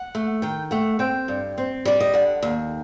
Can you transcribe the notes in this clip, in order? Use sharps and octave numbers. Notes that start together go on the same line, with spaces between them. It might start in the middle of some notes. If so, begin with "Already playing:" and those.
Already playing: F#5
A3
D#3 G5
A3 F#5
C4 G5
G2
C4
G3 D5
D#5
D3 F#5
D#2